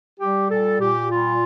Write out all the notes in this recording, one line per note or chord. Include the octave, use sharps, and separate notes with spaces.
G3 G4
A#2 A4
A#2 G4
G3 F4